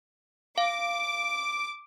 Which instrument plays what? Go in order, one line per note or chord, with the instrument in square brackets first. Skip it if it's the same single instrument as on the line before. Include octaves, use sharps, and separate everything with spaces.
[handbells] F5 [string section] D6